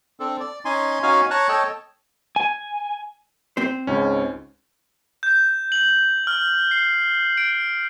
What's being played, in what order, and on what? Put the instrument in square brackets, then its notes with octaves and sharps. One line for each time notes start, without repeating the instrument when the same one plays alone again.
[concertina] C4 D4 A4
D5
C#4 D#4 G#5 C6
C#4 D#4 F#4 F5 G#5
C#5 A5 A#5 C#6 F#6
A4 C#5 D#5 G5 A5
[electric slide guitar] G#5
[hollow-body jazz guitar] C4 C5
[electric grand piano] C#2 C#4 [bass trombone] G#2
[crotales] G6
F#7
F6
C7
D7